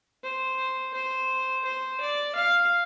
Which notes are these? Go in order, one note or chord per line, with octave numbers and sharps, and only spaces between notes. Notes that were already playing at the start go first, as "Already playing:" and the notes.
C5
C5
C5
D5
F5